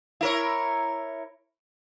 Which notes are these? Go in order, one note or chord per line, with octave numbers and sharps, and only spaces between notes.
E4 A#4 C#5